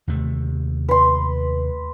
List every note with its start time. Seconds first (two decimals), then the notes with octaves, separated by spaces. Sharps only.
0.08 D#2 C3 A3
0.88 B4 C6